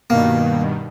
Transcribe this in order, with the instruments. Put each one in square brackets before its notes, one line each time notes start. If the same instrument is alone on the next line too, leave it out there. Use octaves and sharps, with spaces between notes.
[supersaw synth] G2 B2 D#3 [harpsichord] A#3